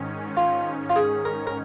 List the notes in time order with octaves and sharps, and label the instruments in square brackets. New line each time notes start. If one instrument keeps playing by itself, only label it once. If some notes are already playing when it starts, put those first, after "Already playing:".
Already playing: [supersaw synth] G#2 D#3 C#4
[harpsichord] F4
F4
G#4
A#4
A#4